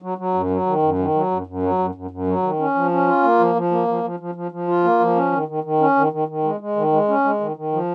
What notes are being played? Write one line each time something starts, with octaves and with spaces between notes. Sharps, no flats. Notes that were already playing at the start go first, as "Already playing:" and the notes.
F#3
F#3
F#2
F#3
D#3
F#2
D#3
F#3
F#2
F#2
F#3
F#2
F#2
F#2
F#3
D#3
C#4
F3
C#4
F4
A#3
F3
F3
A#3
F3
F3
F3
F3
F3
F4
A#3
F3
C#4
D#3
D#3
D#3
C#4
D#3
D#3
D#3
G#3
G#3
D#3
G#3
C#4
G#3
D#3
D#3
F3